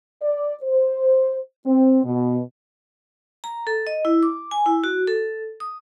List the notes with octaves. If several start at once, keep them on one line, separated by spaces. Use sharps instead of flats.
D5
C5
C4
B2
A#5
A4
D#5
E4
D6
G#5
E4
F#4
A4
D#6